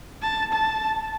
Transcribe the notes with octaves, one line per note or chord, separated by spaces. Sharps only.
A5
A5